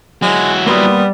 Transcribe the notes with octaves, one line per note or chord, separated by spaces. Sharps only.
F#3 G#3 E4
G3 A#3 B3 C6 D#6